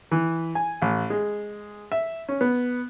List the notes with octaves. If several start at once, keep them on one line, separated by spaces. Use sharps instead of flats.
E3
G#5
A1
G#3
E5
C#4
B3